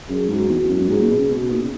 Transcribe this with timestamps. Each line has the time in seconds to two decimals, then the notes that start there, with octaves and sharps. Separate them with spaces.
0.08 F#2 G#4
0.29 G#2 F#4
0.49 E2 F#4
0.63 E2 E4
0.69 F#2
0.76 F#4
0.80 F#2
0.89 G#2 G#4
1.00 A#2
1.10 B2 G#4
1.19 C#3
1.30 B2 F#4
1.50 A#2 D#4
1.61 C#3